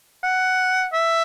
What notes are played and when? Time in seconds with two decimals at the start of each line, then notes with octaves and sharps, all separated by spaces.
0.23 F#5
0.93 E5